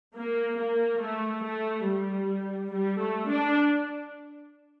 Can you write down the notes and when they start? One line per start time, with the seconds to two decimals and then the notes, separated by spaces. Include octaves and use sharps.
0.16 A#3
0.59 A#3
1.02 A3
1.44 A3
1.86 G3
2.73 G3
3.01 A3
3.29 D4